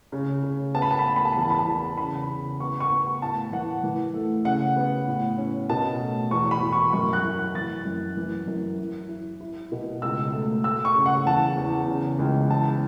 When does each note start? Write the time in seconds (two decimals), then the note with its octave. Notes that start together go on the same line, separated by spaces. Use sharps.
0.12 C#3
0.43 C#3
0.74 B3 A5
0.82 B5
0.91 A5
0.99 B5
1.05 B3 A5
1.16 B5
1.25 A5
1.33 B5
1.36 E2
1.42 A5
1.50 B5
1.59 A5
1.66 E2
1.97 C#3 B5
2.29 C#3
2.60 B3 C#6
2.80 C#6
2.91 B3
3.22 A2 A5
3.52 E3 F#5
3.84 E3
4.14 A3
4.45 C#3 F#5
4.76 B3
5.08 A2
5.38 C#4
5.70 B2 A5
6.00 A3
6.31 E2 C#6
6.51 B5
6.62 E2
6.72 C#6
6.93 F#2 C#6
7.13 F#6
7.24 E4
7.55 E3 A6
7.85 F#2
8.17 E3
8.48 F#2
8.78 E4
9.09 E4
9.41 E4
9.72 B2
10.02 C#2 E6
10.33 A3
10.64 A3 E6
10.85 C#6
10.95 C#3
11.06 F#5
11.26 E2 A5
11.57 E2
11.88 C#3
12.19 C#2
12.50 E2 A5